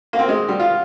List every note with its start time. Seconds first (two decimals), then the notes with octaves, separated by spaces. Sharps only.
0.13 A#3
0.19 C4
0.28 G#3
0.49 G3
0.59 F4